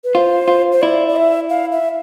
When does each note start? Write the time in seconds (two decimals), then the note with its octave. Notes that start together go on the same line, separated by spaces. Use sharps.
0.04 B4
0.15 F4 C5
0.48 F4
0.72 C5
0.82 E4 D5
1.08 D5
1.16 E5
1.50 F5
1.72 E5